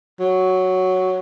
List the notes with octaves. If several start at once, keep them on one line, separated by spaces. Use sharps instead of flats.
F#3